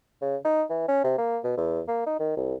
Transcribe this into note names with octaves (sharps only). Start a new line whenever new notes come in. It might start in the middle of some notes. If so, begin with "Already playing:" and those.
C#3
D#4
E3
C#4
C3
A#3
B2
E2
A#3
D#4
D#3
C2